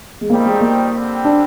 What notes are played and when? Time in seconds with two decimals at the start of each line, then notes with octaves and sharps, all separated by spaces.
0.21 G#3
0.29 F2 D#3 G3 A#3 C4 D#4
0.45 G#3
0.61 A#3
0.93 D3 G3 C4
1.25 D4